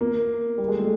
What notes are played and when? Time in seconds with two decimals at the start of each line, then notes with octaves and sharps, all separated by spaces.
0.01 A#3
0.58 G3
0.68 G#3
0.79 A3